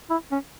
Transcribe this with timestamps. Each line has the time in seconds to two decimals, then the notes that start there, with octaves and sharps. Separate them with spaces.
0.10 E4
0.31 C#4